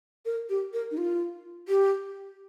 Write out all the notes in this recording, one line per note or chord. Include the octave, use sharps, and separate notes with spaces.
A#4
G4
A#4
D#4
F4
G4